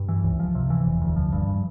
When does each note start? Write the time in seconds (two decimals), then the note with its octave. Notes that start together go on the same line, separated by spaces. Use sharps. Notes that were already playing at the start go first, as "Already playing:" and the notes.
Already playing: G2
0.09 E3
0.24 C#2
0.39 F3
0.55 C3
0.70 E3
0.86 E1
1.02 D2
1.16 F3
1.32 G2